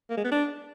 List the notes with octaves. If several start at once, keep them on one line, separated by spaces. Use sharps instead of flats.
A#3
G#3
B3
D4